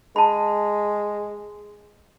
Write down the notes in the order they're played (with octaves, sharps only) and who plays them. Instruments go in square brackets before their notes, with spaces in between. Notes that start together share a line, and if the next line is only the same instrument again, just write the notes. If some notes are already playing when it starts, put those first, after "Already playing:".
[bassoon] G#3 [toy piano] A5 B5